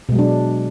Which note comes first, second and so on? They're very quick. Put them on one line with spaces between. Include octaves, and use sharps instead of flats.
B2 G#3 F#3 D4